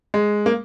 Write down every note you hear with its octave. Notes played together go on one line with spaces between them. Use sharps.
G#3
A#3